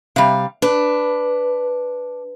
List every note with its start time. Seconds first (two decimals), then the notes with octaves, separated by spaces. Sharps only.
0.16 C3 G3 F5
0.62 D4 B4